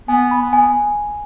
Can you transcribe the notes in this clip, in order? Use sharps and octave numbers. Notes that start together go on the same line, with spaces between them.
B3 G#5
B5
B3
G#5